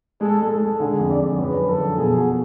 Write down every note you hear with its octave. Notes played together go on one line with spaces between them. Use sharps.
G#3 A4
G#3
A4
G#3
D3 G#4
F2
D5
D3
F#2 B4
D3
A4
F3
B2 G#4
F#4